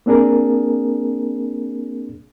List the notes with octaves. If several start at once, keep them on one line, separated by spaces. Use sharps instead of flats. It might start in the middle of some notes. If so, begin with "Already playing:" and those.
A#3 C4 D4 G#4 A#4